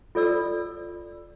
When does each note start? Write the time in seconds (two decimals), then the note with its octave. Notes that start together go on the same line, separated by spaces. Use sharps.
0.15 F4 A4 D5 E6